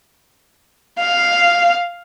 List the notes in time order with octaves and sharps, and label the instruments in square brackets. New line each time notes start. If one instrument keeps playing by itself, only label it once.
[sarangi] F5